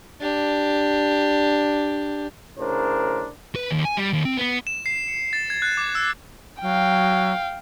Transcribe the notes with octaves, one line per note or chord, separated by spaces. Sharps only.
D4 G4
A2 C#3 D4 A#4 C5
B4
D#2
G#5
G3
D#2
C4
B3
E7
C7
C#7
A6
G#6
F#6
D6
E6
F#3 F5 G5